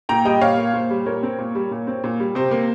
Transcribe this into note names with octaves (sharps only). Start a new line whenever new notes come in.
A#2 G5 A#5
G3 D#5 G5
A#2 C#5 F5
A#3
A#2 C5
G3
A#2 A#4 C#5
C4
A#2
G3
A#2
C4
A#2
G3
C3 C5
A#3